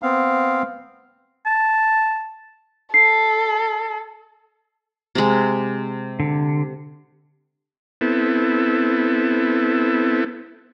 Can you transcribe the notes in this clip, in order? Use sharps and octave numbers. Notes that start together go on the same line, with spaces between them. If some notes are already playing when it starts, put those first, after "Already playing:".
B3 C4 F5
A5
A4 C7
C3 G#3
D3
B3 C4 E4 A4